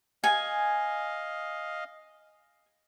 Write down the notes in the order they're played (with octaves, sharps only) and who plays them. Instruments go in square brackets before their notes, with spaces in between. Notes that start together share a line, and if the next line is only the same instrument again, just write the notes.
[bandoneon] D#5 F5 [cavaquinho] G#5